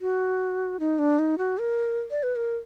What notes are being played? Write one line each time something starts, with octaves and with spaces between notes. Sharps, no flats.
F#4
D#4
D4
D#4
F#4
A#4
D5
B4
A#4